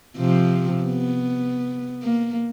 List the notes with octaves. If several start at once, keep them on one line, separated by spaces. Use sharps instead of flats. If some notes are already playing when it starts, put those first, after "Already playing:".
C3 F3
B3
A#3